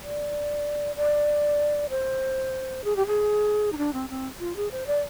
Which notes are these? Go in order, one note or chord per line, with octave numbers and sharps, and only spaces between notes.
D5
D5
C5
G#4
G4
G#4
D#4
D4
C4
C4
F4
G#4
C5
D5